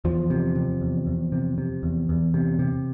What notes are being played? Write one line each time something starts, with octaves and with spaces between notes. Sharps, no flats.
E2 F3
C3
C3
E2
E2
C3
C3
E2
E2
C3
C3